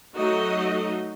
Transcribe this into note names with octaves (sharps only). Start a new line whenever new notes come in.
F#3 A3 D#4 F#4 D#5